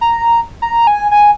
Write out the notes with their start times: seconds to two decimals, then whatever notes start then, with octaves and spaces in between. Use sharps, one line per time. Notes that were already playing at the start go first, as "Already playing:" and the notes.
0.01 A#5
0.62 A#5
0.87 G#5
1.11 G#5